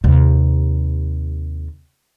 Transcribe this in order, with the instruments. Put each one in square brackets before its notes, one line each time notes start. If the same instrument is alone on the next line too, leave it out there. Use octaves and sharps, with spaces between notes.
[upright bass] D#2 C3